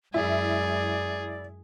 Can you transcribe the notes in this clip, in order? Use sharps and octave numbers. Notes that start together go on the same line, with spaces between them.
F#2 G#3 E4 G#4 D5